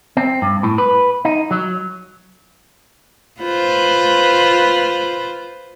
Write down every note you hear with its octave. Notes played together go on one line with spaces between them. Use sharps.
C4
G2
A2
B4
D#4
F#3
F4 B4 C5